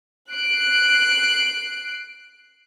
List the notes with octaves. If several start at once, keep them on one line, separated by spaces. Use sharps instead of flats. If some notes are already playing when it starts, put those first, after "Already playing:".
F#6 C7 D7